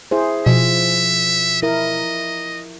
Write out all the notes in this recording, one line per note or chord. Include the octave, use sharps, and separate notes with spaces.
E4 G#4 C5
B2 F3 E5
E4 A#4 D#5